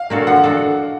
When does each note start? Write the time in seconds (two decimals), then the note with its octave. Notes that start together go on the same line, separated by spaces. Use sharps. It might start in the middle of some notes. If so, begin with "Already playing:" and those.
Already playing: F5
0.10 A#3 D4 F#4 A4
0.27 F3 F#5
0.44 D4 F#4 A4